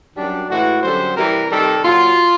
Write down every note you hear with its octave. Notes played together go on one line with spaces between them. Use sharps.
F#2 D#3 G3 D4
A2 E3 G#3 F#4
F#2 D3 G3 C5
C3 E3 G3 A#4
C3 D#3 G3 A4
A#2 F#3 F4